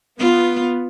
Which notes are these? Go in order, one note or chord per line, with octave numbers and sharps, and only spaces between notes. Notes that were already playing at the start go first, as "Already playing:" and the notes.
B3 F4